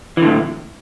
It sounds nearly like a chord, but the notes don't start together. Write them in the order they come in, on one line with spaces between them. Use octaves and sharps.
E3 D3 A2